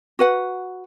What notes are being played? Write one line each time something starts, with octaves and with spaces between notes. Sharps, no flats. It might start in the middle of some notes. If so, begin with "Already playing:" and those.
F#4 B4 F#5